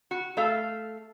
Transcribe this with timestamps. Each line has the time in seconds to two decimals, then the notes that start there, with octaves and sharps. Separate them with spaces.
0.11 F#4
0.37 A3 A4 F5